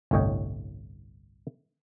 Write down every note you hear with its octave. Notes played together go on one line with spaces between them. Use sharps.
G1 C2 A2 C#5 D#5 G5